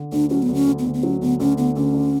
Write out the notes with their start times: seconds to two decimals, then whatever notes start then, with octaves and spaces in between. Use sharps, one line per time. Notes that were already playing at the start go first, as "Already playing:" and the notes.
Already playing: D3
0.12 D2 D4
0.30 F#3 C#4
0.42 B3
0.48 D2
0.55 C#4
0.67 D2
0.79 B3
0.85 D2
0.94 B3
1.03 F#3 C#4
1.21 D2 B3
1.40 D2 C#4
1.58 D3 B3
1.76 D2 C#4
1.94 D3